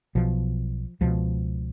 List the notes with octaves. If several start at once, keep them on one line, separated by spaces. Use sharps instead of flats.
B1 B2 F3
C#2 B2 F3